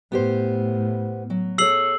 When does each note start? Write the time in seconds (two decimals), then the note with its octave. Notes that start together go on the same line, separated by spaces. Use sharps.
0.12 A2 B3 G4 C5
1.30 F#3
1.58 G#4 A4 C#5 E6 C7 F#7